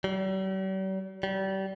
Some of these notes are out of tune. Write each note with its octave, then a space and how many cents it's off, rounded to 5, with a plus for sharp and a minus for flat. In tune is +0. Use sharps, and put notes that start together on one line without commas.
G3 -45
G3 -30